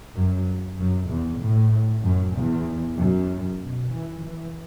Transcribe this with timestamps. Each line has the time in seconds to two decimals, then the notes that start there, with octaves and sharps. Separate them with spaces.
0.16 F#2
0.78 F#2
1.09 E2
1.41 A2
2.03 F#2
2.35 E2
2.97 F#2
3.61 B2
3.91 E3
4.23 E3